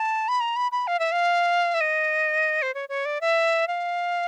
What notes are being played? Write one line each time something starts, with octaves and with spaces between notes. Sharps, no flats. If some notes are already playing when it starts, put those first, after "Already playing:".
Already playing: A5
B5
A#5
B5
B5
F5
E5
F5
E5
D#5
C5
C#5
C#5
D5
E5
F5